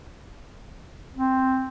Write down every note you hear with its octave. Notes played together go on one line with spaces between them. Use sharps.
C4